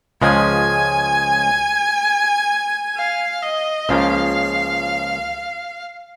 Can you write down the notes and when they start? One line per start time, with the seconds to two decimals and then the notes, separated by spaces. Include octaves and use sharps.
0.21 C#2 C#3 F3 G#3 G#5
2.97 F5
3.43 D#5
3.89 C#2 C#3 F3 A#3 F5